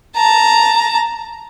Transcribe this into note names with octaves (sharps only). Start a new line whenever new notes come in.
A5 A#5